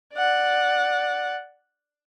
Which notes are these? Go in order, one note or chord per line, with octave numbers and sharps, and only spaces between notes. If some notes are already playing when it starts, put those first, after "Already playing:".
D5 F#5